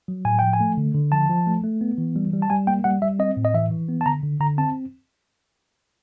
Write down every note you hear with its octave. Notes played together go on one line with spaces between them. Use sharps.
F#3
A2 G#5
F3 G5
G#5
A3
D3
D3
F3 A5
F3
A3
A3
B3
E3
G3
G3
A5
G3 G#5
A#3 G5
G3 F#5
G3 E5
C4 D#5
A2
D#5
E3 E5
E3
B3
A5
D3 A#5
D3
D3 A#5
C4 A5